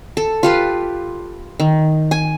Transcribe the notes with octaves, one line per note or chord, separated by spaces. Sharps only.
A4
F4 G4 B4
D#3
G#5